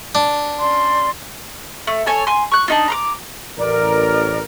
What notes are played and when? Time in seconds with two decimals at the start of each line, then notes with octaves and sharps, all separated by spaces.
0.15 D4
0.58 C#4 D5 C6
1.87 A3
2.06 A4 C#5 G#5
2.27 G#5 C6
2.52 C#6 F#6
2.68 D4 D#4 F4
2.88 A#5 C6 D6
3.58 A1 A#4 D5